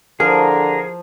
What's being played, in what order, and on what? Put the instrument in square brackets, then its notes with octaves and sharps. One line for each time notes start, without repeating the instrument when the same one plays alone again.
[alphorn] D3 [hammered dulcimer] F3 [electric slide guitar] G#4 [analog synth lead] A#4